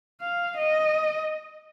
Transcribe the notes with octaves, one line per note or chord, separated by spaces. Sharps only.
F5
D#5